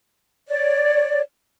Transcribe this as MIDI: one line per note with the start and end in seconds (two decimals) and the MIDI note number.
0.48 1.20 73
0.48 1.20 74